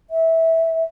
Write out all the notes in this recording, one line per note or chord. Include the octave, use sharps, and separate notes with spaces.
E5